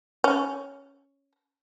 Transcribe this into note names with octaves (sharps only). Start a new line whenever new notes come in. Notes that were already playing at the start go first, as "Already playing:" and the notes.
C#4